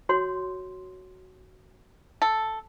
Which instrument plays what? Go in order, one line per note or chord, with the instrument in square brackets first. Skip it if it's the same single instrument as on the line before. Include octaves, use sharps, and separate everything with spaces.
[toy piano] F#4 C#5 C6
[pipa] A4